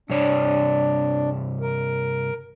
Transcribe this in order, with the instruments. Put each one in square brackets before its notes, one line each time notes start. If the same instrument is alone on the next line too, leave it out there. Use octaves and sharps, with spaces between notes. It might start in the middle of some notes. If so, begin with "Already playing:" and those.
[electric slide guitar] G2 C3 C#5 [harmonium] D4
[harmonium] A#4